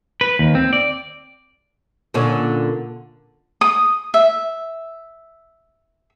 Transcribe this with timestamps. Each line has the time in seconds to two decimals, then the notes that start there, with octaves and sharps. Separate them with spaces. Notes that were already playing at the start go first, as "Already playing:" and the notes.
0.21 B4
0.39 D#2
0.55 C4
0.73 D5
2.14 A#2 D3 C#4
3.61 D#6
4.14 E5